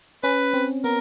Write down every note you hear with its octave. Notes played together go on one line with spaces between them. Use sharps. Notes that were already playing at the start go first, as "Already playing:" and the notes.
C#4 B4
C4
B3 A#4